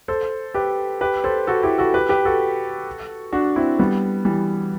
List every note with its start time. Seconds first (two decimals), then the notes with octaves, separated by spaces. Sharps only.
0.08 A4 C5
0.54 G4 B4
1.01 G4 B4
1.24 A4 C5
1.47 F#4 A4
1.63 E4 G4
1.78 F#4 A4
1.94 G4 B4
2.09 G4 B4
2.25 F#4 A4
3.32 D4 F#4
3.56 C4 E4
3.79 G3 B3
4.25 E3 G3